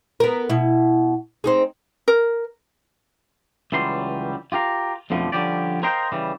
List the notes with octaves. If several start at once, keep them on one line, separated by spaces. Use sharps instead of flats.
B3 A#4
B2 E4
C4 D#4 G#4
A#4
C#2 E3 F#3 G3 C6
F4 G4 A#4 F5
B1 F2 D3 F3 G3 A3
D3 F3 G3 C#4 G4 D5
A#4 C5 D#5 F5 G5 C6
C#3 E3 G3